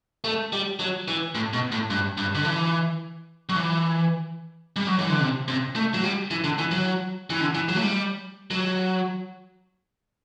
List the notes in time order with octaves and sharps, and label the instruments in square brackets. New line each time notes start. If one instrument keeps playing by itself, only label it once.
[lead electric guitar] A3
G3
F#3
E3
A2
B2
A2
G2
G2
D3
E3
F#3
E3
G3
F#3
E3
D3
C3
C3
A3
F#3
G3
E3
D3
E3
F#3
E3
D3
E3
F#3
A3
G3
F#3